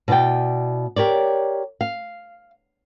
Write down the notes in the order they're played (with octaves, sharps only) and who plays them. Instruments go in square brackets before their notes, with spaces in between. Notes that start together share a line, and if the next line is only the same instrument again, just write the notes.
[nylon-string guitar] B2 E4 B4 D5 G5
G4 A#4 C#5 D5
F5